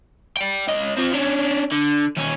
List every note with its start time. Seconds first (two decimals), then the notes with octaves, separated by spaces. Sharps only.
0.37 D5 G5
0.67 C#2 D#5
0.97 F3 C4
1.13 C#4 D4
1.71 D3
2.17 D#2 C#4